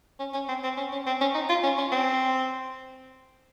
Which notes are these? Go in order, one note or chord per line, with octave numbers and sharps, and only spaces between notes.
C#4
C#4
C4
C4
C#4
C#4
C4
C#4
D#4
F4
C#4
C#4
C4